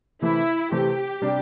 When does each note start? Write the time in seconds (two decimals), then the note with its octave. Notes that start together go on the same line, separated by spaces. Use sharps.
0.22 C3 E3 A3 C4 E4
0.71 C3 E3 A3 C4 G4
1.22 C3 G3 D4